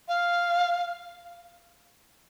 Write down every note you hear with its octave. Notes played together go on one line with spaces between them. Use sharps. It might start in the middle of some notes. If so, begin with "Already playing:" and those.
F5